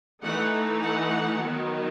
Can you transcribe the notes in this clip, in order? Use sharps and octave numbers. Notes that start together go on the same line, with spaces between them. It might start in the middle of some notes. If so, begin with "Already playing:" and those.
E3 A3 D#4 F#5
F#5
D#3 F#3 B3